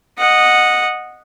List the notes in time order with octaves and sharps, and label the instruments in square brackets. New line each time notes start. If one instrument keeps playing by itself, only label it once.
[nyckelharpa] D#5 F#5